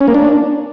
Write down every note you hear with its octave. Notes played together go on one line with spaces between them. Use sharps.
C#4
A#3
D4